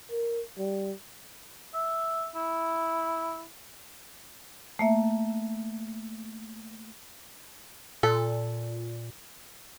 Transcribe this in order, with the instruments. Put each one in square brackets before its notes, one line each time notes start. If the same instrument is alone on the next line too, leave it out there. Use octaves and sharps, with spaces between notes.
[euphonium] A#4
G3
[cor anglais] E5
E4
[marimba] A3 A#3 E5
[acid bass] A#2 [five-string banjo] A4